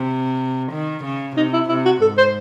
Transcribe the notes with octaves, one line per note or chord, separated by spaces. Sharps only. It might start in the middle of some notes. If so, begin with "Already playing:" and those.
Already playing: C3
D#3
C#3
C3 D#4
E4
C3 E4
F#4
G#2 A4
C5